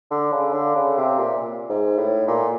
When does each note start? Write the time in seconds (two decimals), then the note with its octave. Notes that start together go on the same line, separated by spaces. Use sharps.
0.11 D3
0.32 C#3
0.53 D3
0.76 C#3
0.98 C3
1.19 A#2
1.70 G#2
1.98 A2
2.28 A#2